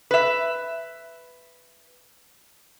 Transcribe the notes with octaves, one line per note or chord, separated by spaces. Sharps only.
B4 E5